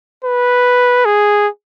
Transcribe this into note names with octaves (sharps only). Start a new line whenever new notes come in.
B4
G#4